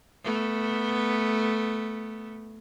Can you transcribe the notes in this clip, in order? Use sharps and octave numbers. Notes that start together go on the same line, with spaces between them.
A3 B3